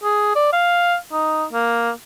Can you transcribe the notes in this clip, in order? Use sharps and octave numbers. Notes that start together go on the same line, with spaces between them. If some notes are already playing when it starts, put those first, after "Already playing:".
G#4
D5
F5
D#4
A#3